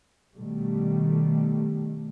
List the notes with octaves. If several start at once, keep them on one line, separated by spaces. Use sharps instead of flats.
B2 D#3 G3 A3